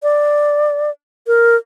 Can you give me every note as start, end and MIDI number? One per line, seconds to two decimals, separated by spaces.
0.03 0.90 74
1.27 1.56 70